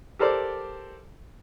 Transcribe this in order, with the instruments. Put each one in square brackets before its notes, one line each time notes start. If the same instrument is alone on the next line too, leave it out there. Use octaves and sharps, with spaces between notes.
[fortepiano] G4 A4 A#4 C5 D5